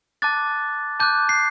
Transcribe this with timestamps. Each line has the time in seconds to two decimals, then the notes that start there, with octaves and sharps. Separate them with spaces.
0.22 A5 D6 F#6 A6
1.00 A5 D6 F#6 G6
1.29 C7